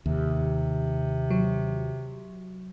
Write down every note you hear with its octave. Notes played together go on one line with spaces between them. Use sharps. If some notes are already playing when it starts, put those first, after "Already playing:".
D#2 C3
F#3